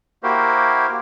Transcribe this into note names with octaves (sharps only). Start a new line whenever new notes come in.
A#3 E4 F#4 G4 A#4 C5